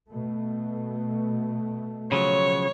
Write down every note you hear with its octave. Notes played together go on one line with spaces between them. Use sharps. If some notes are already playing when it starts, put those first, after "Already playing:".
B2 A3
C#3 F3 F#3 C#5